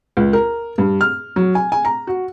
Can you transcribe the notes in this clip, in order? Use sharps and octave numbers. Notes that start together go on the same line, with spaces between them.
C#2
A#4
G2
F6
F#3
G#5
G#5
A#5
F#4